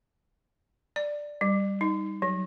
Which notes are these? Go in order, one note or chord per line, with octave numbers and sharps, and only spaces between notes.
D5
G3
D#4
F#3